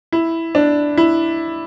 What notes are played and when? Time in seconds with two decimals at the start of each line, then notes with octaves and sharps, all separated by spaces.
0.12 E4
0.55 D4
0.97 E4